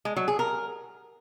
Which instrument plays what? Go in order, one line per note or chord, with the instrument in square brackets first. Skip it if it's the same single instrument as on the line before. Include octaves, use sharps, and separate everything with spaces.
[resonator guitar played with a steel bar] G#3
F#3
G#4
A#4